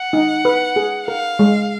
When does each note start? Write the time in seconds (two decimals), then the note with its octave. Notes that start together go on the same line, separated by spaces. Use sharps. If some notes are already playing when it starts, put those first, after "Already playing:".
Already playing: F#5
0.13 D#4
0.45 B4
0.76 G#4
1.08 A#4 F5
1.39 G#3